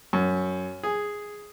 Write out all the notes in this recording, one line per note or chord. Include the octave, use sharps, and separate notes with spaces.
F#2
G#4